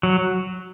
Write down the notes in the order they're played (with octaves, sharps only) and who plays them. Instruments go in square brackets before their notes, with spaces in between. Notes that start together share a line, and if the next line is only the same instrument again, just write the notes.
[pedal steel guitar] F#3